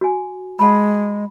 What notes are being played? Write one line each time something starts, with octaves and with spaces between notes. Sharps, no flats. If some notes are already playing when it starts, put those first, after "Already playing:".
F#4 G#5
G#3 F#5 A5 B5